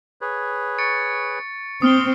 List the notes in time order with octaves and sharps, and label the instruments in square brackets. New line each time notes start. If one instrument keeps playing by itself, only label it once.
[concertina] G#4 B4 C#5
[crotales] C#6 A6 C#7
[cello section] C4 [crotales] D#6 F6 G7